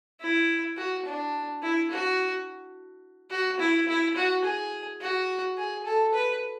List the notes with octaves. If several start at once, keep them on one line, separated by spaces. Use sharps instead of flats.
E4
F#4
D4
E4
F#4
F#4
E4
E4
F#4
G#4
F#4
G#4
A4
B4